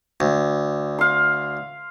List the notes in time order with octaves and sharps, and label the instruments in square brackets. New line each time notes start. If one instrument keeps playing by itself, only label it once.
[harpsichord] D2
[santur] F5 C6